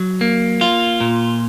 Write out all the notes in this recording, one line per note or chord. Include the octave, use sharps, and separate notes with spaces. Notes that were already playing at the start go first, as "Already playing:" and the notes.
Already playing: F#3
A#3
F4
A#2